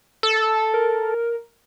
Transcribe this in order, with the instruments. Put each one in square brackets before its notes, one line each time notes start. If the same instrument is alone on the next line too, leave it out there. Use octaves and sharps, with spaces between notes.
[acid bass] A4 [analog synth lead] E6
[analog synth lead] A#4